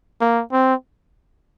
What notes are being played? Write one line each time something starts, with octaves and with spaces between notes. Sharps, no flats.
A#3
C4